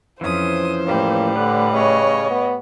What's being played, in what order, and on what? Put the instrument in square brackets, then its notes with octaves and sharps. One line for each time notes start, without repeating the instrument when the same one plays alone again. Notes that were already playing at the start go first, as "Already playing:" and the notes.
[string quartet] F2 D#6 [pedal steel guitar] E3 F3 C#4 [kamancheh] C5
[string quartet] A2 G3 [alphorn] A#3
[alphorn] D3 [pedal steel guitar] B4
[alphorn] C#3 [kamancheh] C#5 D#5
[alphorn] B3